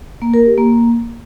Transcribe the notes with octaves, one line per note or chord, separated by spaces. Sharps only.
A#3
A#4
G4
A#3